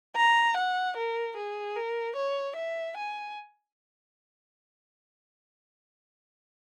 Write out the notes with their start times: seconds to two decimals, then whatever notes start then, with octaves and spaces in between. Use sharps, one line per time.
0.16 A#5
0.57 F#5
0.97 A#4
1.37 G#4
1.76 A#4
2.16 C#5
2.56 E5
2.97 G#5